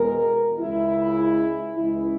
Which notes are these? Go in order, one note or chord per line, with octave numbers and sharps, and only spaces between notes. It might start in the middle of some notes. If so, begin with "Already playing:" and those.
Already playing: E2 B2 G#3 A#4
C#2 C#3 G#3 E4
C#2 C#3 E3 G#3 E4